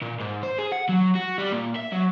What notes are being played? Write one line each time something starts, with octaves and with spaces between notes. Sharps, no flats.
A#2
G#2
C5
G#4
F#5
F#3
F#4
G3
A#2
E5
F#3